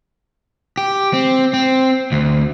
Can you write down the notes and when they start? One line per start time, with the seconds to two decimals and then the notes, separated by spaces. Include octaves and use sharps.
0.78 G4
1.13 C4
1.53 C4
2.12 D2